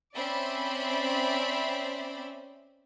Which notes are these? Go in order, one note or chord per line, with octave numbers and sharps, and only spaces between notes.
C4 C#4 D5 E5 B5